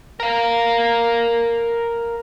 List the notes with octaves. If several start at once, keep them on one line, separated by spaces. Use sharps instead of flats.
A#4 F5